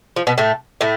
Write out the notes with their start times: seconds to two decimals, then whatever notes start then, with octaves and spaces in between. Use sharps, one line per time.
0.16 F3
0.27 B2 B3
0.38 A2 A3
0.81 A2 A3